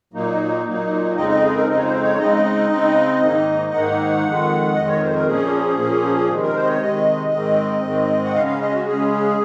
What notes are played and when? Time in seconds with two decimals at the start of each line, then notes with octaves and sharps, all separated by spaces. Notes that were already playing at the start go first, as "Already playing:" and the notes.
0.14 A#2 F#3 A#3 D#4
0.65 A#2 F#3 A#3 D#4
1.16 F2 C#3 G#3 C4 D#4 D#5
1.29 D#5
1.42 G#4
1.54 A#4
1.67 F2 C#3 G#3 C4 D#4 D#5
1.77 C#5
1.84 C5
2.02 C#5
2.18 C#3 G#3 C4 D#4 D#5
2.70 C#3 G#3 C4 D#4
3.21 G#2 D#3 A#3 D#4
3.72 G#2 D#3 A#3 D#4 F#5
4.23 F2 D#3 G#3
4.75 F2 D#3 G#3 D#5
4.88 C#5
4.96 A#4
5.01 C5
5.14 A#4
5.26 A#2 F3 A#3 C#4 G#4
5.77 A#2 F3 A#3 C#4
6.29 C3 D#3 G#3
6.42 A#4
6.55 C5
6.63 D#5
6.67 C#5
6.80 C3 D#3 G#3 D#5
7.32 G#2 D#3 G#3 C4
7.83 G#2 D#3 G#3 C4
8.25 F#5
8.34 C#3 G#3 C#4 F5
8.47 F5
8.60 D#5
8.72 F#4
8.85 C#3 G#3 C#4 G#4